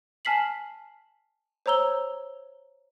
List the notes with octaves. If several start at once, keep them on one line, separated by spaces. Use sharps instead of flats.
G#5 A5 F6 B6 C7 F#7
C5 C#5 A#5 E6 G7